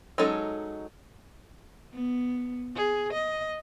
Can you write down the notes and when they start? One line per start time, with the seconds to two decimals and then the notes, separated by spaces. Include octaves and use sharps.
0.18 F#3 G#3 C#4 D#4 A4
1.93 B3
2.76 G#4
3.13 D#5